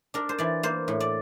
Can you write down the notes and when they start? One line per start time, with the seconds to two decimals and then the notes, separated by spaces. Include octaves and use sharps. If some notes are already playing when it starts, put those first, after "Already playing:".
0.14 D4 A#4
0.29 C5
0.38 E3 D5
0.63 A#3 C5
0.88 A2
1.00 D5